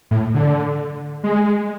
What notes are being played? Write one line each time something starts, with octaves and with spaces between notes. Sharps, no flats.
A2
D3
G#3